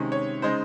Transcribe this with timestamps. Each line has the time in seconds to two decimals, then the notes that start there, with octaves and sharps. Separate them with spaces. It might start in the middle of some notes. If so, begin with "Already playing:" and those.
Already playing: C3 D#3 G#3 C#4
0.12 C#5
0.42 C#3 G#3 D#4 C5